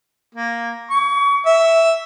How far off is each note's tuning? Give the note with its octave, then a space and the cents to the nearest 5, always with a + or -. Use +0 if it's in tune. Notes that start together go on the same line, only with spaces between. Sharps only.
A#3 +0
C#6 +30
E5 +0